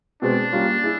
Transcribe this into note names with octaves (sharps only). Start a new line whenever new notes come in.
B2 G#3 C4 D4
G3 A#3 C#4 F4
E4 G#4